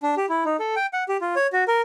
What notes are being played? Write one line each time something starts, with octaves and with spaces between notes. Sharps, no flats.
D4
G4
E4
D#4
A4
G5
F#5
G4
F4
C#5
F#4
A#4